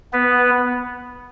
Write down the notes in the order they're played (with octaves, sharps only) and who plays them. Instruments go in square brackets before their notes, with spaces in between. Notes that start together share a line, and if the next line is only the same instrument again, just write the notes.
[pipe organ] B3 B4